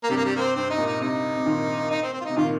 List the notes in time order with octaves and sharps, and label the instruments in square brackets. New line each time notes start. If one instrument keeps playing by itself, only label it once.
[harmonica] A#3
[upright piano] G2 C3 [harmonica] G3
[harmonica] A#3
G3
A#3
C4
[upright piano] G2 [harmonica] C4
[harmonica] D#4
[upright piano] A#2
[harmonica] D#4
[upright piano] G2 C3 [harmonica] D#4
[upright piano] C3
A#2 D#3
[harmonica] D#4
C4
C4
F4
[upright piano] C3 [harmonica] D#4
[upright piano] A#2 D#3 [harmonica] F4